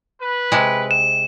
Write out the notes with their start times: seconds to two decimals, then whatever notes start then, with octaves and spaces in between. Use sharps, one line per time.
0.20 B4
0.52 C3 G#3
0.91 E7